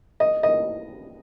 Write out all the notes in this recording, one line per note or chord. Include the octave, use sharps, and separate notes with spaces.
D#5
D#5